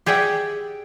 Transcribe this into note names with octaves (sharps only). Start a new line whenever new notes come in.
G4 G#4 D5 E5 F#5 G5